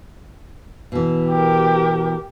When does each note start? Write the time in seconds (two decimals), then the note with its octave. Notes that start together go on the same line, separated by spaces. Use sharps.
0.92 B2 E3
1.28 G4 A#4